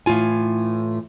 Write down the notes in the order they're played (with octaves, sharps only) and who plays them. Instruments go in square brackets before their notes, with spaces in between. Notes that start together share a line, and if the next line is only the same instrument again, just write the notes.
[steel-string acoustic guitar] A2 E3 F4 G#5